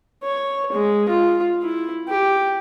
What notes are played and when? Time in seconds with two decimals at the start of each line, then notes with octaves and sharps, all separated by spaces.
0.24 C#5
0.73 G#3
1.09 F4
1.63 E4
2.08 G4